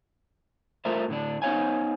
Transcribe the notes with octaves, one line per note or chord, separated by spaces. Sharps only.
A3 F4 A4 A#4 C5 E5
A2 D3 D4
B3 D#4 C5 C#5 F5 G#5